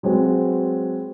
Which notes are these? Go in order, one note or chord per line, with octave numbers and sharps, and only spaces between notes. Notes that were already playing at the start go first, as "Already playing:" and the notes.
F#3 G#3 C4 F#4 B4